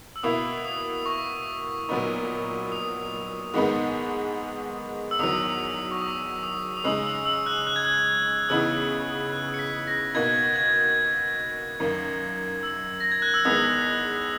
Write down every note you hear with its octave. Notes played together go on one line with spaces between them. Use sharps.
E6
B2 A#3 E4 D#6
D#6
C#6
A#2 F#3 B3 D#4
D#6
G#2 D#3 G#3 B3 D#4
E6
E2 D#3 F#3 D#6
C#6
D#6
D#6
D#6
C#3 G#3 D#4 E6
E6
E6
F#6
F#6
G#6
F#6
C#3 E3 B3 D#4 E6
F#6
C#7
B6
A#6
B2 A#3 D#4 G#6
G#6
F#2 D#3 A#3
E6
A#6
G#6
F#6
E6
E2 D#3 G#3 B3 D#6